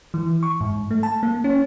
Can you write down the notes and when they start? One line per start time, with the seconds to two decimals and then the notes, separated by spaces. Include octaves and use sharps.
0.14 E3
0.43 C#6
0.61 G#2
0.91 A3
1.03 A5
1.23 A#3
1.44 C#4